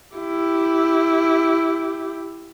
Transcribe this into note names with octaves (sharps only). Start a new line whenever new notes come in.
E4 G4